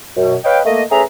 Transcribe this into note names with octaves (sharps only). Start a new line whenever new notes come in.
F#2 B2
B4 C#5 D#5 F5 G5
A3 A#3 D#5
A3 C#4 G#4 B4 E5 A#5